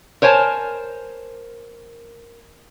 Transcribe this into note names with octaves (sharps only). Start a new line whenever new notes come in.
A#4 C5 C#5 G#5 A5